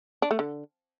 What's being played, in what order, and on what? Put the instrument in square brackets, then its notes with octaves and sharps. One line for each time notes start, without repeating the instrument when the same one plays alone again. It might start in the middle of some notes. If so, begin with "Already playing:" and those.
[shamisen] D4
A3
D3